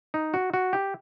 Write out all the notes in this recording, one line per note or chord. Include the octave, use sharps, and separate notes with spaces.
D#4
F#4
F#4
G4